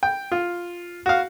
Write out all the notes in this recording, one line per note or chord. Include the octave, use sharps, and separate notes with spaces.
G5
F4
F#4 F5